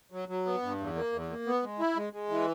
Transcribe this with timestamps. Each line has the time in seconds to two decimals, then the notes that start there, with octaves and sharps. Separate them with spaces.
0.12 F#3
0.29 F#3
0.46 B3
0.62 G2
0.79 E2
0.95 A#3
1.13 E2
1.29 A#3
1.46 B3
1.63 G#3
1.79 E4
1.96 G#3
2.13 G#3
2.29 E3